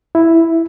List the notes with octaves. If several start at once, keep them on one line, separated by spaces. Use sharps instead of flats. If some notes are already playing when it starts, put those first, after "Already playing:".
E4